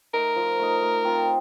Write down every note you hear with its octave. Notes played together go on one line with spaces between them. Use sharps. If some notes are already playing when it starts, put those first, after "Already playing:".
A3 D#4 A#4
F3
A3 D#4
A3
C4 F4 C5